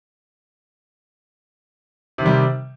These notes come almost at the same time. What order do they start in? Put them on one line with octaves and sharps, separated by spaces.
C3 D#3 G3